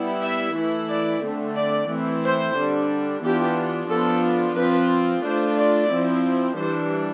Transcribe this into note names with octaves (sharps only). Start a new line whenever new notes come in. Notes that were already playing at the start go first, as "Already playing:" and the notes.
Already playing: G3 B3 E4
E5
E3 A3 E4
D5
D3 A3 C4
D5
E3 A3 C4 E4
C5
D3 G3 D4
E3 B3 D4 F4 G4
F3 B3 D4 F4 A4
F3 C4 F4 B4
A3 D4 F4 C5
D5
F3 C4 E4
E3 G3 D4 C5